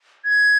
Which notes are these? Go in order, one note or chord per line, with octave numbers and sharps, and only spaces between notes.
G#6